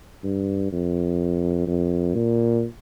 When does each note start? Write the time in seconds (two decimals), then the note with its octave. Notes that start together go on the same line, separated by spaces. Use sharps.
0.24 G2
0.72 F2
1.67 F2
2.14 A#2